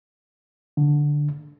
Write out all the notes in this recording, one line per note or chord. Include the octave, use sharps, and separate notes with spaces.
D3